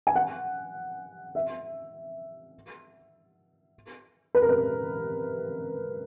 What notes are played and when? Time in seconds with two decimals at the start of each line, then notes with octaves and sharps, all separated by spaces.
0.07 G#5
0.15 F#5
1.35 E5
4.35 B4
4.42 A#4
4.49 B4